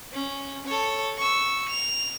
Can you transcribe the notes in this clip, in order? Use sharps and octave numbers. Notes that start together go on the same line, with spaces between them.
C#4
A4 C#5
C#6 E6
F7